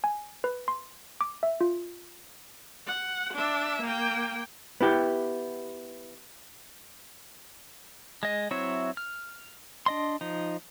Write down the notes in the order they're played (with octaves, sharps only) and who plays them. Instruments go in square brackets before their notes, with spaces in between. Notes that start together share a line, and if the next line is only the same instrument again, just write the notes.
[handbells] G#5
B4
C6
D6
E5
F4
[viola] F#5
D4 E5
A#3 G5
[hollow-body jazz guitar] B3 E4 G4
[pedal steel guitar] G#3 D#5
F#3 C4 E4 C#5 E5
F6
D4 D#5 C6
F3 D#4